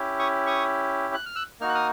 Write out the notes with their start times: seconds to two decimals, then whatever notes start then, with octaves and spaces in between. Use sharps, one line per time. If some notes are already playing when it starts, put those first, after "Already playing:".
Already playing: C#4 E4 G4
0.19 C#6 D#6
0.47 C#6 D#6
1.14 F#6
1.26 F6
1.36 E6 F#6
1.61 A#3 D#4 F#4 F6
1.69 F#6
1.75 D#6 F6